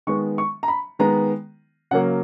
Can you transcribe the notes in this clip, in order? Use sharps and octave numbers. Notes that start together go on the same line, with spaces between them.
D#3 G#3 B3 C#6
C#6
A#5
B5
D#3 G#3 B3 A#5
C#3 F#3 A#3 F#5